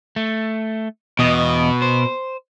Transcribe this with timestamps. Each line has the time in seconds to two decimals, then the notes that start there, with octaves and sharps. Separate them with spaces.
0.16 A3
1.19 E2 B2 D#5
1.82 C5